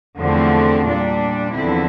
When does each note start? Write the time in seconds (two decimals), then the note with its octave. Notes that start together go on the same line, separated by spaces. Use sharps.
0.19 E2 D3 F3 A3 C4
0.86 A#2 G3 D4
1.54 E2 D3 F3 C4 E4